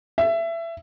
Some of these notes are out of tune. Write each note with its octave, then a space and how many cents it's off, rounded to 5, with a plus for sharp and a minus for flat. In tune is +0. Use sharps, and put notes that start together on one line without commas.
E5 +20